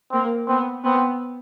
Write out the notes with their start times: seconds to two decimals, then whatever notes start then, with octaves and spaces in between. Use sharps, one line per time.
0.12 A#3 C4
0.48 B3 C4
0.84 B3 C4